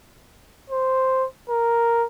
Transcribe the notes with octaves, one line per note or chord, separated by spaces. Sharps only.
C5
A#4